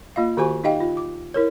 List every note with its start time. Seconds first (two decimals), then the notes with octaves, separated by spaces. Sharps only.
0.16 A#3 F4 D#5 F5
0.37 D#3 F#4 G4 C5 G#5 C#6
0.64 D#4 G4 D#5 F5 G5
0.80 F4
0.97 D6
1.34 E4 A#4 C#5